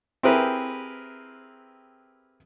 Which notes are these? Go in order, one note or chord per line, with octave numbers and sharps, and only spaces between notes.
C4 E4 G4 G#4 A#4 B4